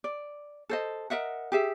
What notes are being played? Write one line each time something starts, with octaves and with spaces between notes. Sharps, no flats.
D5
A4 C5 D#5
A#4 D#5 E5 F#5
G4 G#4 E5